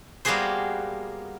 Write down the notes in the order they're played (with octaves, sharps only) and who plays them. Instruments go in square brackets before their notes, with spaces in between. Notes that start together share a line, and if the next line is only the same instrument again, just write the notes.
[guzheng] G3 A#3 B3 F#4 G#4 C5